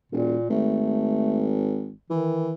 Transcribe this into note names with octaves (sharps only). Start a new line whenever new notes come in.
E1 A#2
G#1 A3
D#3 E3